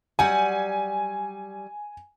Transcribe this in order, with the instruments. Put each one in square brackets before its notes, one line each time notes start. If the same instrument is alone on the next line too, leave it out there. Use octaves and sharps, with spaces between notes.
[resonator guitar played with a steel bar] F#3 G3 F#5 [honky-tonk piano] G#5